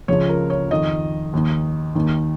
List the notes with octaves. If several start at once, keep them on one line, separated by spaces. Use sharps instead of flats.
C#2 C#3 F3 C#5
A#4
C#5
F2 D#3 D#5
D#2 D#3
D#2 D#3